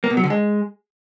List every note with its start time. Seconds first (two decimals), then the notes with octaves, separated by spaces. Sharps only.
0.04 A#3
0.10 B2
0.17 F#3
0.24 D3
0.30 G#3